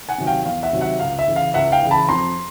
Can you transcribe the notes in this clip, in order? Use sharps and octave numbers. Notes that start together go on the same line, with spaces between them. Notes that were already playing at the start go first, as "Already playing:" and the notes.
F#5 G#5
C3 D#3 F#3
F5 G5
E2 F5
E5 F#5
C3 D#3 F#3
E5 F#5
C#2 F5
E5
C#3 E3
F5
C#2 E5 F#5
F5 G5
C#3 E3
A5 B5
F2 A#5 C6